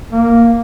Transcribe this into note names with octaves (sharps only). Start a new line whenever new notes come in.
A#3